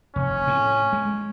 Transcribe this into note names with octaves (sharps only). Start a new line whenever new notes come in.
F1 C#4
A2
G#3